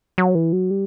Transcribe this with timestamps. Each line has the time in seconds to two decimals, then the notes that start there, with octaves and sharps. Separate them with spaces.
0.18 F#3
0.35 E3
0.53 F#3
0.71 G3